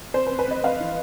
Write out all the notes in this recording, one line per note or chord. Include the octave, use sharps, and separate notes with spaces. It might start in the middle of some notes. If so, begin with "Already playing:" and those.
C4 C5
B4
C4
B4
C4 D#5
C4 F5
E3